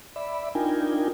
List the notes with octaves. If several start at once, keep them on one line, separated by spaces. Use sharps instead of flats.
D5 E5 B5
D4 D#4 F4 A#4 G5 G#5